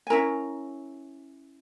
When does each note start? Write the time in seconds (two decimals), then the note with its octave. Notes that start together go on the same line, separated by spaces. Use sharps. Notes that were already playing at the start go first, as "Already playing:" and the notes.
0.07 G#5
0.10 C#4 E4 A#4 A#5